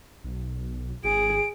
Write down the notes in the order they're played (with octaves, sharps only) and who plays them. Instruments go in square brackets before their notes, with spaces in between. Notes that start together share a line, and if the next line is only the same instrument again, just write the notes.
[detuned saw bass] B1
[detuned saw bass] G#1 [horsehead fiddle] G#4 [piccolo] D7